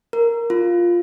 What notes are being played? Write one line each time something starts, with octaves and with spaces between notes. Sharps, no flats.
A#4
F4